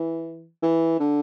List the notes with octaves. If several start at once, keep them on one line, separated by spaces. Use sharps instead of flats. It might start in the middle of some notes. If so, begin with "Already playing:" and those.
Already playing: E3
E3
D3